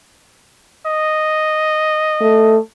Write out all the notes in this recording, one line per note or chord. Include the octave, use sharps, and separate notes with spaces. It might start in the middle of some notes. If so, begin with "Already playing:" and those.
D#5
A3